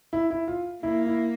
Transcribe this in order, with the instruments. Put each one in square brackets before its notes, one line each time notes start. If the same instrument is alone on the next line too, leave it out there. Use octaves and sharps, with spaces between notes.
[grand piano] E4
E4
F4
[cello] A#3 [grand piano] E4
[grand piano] E4